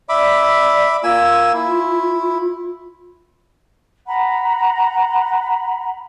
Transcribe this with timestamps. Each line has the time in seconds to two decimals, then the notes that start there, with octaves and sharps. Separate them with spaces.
0.09 D5 E5 B5 D6
1.03 A#3 F4 G#5 E6
1.54 E4
4.06 F#5 A#5 B5